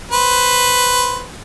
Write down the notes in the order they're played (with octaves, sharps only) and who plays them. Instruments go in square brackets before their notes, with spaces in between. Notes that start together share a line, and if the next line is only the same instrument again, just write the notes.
[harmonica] B4 C5